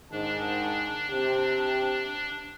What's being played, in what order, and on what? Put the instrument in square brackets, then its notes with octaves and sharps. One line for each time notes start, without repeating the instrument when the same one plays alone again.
[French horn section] G#2 D#3 [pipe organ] D4
[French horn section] C3 G4